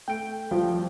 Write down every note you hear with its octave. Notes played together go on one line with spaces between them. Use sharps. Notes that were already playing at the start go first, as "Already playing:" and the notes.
A3 G5 D7
C2 F3